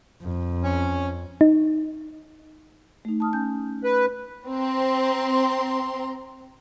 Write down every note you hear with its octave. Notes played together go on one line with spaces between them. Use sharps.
F2
C#4
D#4
A3 D#4
A5 D#6 F6
C#4 G#5 G6
B4
C4 A#5 C6